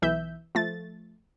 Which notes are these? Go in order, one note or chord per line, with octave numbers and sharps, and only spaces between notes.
B1 E3 E5 G6
F3 A3 A6